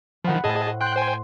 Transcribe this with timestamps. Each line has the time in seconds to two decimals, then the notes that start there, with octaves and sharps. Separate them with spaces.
0.24 D#3 F3 F#5 B5
0.44 A2 G#4 C5 D#5 A5
0.81 G5 C6 F#6 G6
0.96 C5 G5 G#5